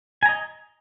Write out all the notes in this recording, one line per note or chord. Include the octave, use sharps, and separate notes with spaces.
D#5 G#5 A#5